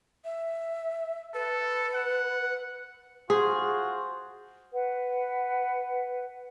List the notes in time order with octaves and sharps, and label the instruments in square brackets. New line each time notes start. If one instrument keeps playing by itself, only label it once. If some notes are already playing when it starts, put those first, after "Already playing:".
[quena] E5
[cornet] A4 [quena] B4
[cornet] F#5
[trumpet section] F4 F#4 C5 [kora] G#4
[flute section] B4 F#5